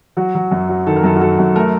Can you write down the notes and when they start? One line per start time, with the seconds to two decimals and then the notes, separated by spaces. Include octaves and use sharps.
0.17 F#3 F#4
0.35 F#3
0.51 F#2
0.69 F#3
0.87 D#3 A4
0.96 A#4
1.04 F#2 A4
1.16 F#4
1.21 F#3 A4
1.39 F#2
1.56 A3 A#4